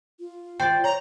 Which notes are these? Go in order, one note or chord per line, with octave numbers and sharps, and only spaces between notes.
F4
C5 D5 G5
C#5 A#5